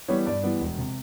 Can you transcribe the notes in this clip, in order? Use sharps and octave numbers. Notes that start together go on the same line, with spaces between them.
E3 G3 B3 C#5
G2 D5
E3 G3 B3
E1
C3